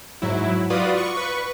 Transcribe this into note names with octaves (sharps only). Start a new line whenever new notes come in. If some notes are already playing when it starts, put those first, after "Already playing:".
G#2 F#3 E4
F4 F#4 B4 D5 D#6
C#6
B4 C#6